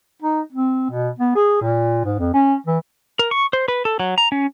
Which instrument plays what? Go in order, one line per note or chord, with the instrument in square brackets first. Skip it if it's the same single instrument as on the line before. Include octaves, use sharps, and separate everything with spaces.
[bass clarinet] D#4
C4
B2
B3
G#4
A#2
G#2
F2
C#4
E3
[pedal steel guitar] A#4
C#6
C5
B4
A4
F#3
A#5
C#4